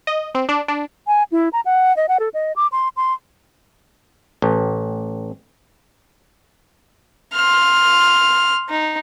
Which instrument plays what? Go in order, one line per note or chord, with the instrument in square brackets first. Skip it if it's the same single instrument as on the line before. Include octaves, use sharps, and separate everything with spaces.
[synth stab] D#5
C4
D4
D4
[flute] G#5
E4
A#5
F#5
D#5
F#5
A4
D#5
D6
C6
C6
[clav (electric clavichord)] A1
[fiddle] C6 F6
D#4